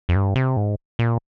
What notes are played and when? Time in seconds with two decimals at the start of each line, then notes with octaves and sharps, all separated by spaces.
0.09 F2
0.15 G2
0.36 C3
0.57 G#2
0.99 A#2